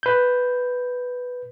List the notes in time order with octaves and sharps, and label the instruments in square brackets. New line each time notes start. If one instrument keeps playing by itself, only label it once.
[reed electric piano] B4 G6